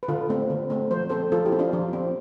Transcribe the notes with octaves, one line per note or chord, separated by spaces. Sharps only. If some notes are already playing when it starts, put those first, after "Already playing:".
B4
D3 F4 A4
A3 C4
D3
A3 C4
F3 C5
C4 A4 C5
F3 F4 A4
E4 G4
C4
D4 F4
F3
C4